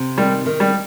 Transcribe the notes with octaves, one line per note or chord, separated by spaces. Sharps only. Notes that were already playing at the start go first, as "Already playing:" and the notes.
Already playing: C3
D#3 G3
D#3
G3